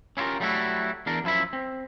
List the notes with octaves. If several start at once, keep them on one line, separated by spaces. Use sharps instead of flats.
C#4 E4 F4 G4 A#4
F#3 G3 A3 B3 E4 F#4
E2 D4 A#4
F#2 F3 E4 E5 B5
C4